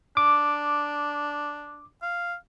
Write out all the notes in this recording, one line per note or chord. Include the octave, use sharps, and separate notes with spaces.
D4 D6
F5